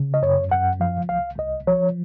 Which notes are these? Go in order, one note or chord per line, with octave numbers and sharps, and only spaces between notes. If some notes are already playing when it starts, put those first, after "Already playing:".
Already playing: C#3
D#5
F#2 C#5
F#2 F#5
F3 F5
C2 F5
C2 D#5
F3 C#5